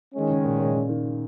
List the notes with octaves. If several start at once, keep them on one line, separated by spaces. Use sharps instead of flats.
D#3 G#3 C#4
C#3
A#2
A#2
C#3
D#3